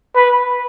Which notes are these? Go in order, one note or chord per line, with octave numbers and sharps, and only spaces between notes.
B4